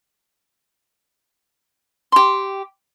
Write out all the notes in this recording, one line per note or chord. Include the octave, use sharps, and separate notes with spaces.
G4 C6